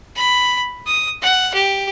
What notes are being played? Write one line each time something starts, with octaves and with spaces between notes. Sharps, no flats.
B5
D#6
F#5
G4